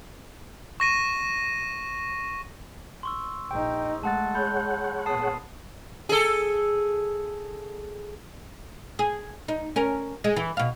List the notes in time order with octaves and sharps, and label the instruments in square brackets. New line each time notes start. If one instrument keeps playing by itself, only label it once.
[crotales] C#6 A#6 D#7
[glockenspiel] C6 C#6 E6
[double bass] A#1 D#4 [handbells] G5
[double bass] G#3 [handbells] A3 F#5 A6 [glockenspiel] A5 C6 F#6
[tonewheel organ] G#4 C#5 F#5 [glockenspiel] B5 [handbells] G6
[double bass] A#2 B3 [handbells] A5 D#6 [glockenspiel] C7
[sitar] G#4 A4
[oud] G#4
D#4
C#4 A#4
G#3
E3
B2 F5